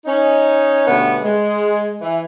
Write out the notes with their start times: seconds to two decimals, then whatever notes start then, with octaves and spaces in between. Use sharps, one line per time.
0.06 C#4 D#4
0.88 B2 D3 G3 A3 B3 C#4
1.23 G#3
2.02 E3